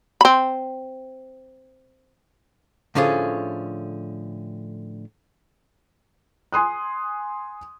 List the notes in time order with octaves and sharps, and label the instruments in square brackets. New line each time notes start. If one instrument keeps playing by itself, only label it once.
[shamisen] C4 B5
[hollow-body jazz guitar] A2 D3 F3 C#4 G#4
[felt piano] G#5 C6 D#6 F#6